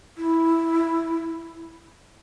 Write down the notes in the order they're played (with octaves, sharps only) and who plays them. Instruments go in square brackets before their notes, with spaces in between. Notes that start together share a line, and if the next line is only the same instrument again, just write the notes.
[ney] E4